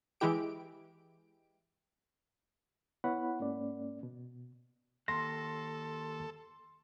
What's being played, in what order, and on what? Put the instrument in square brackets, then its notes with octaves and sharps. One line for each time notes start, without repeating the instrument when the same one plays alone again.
[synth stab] E3 G#3 E4 G4 D7
[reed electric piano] B3 E4 C#5 F#5 B5
G#2 A#3 C#4 D5
B2
[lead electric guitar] D#2 [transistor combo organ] A4 [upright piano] C6 [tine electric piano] A#6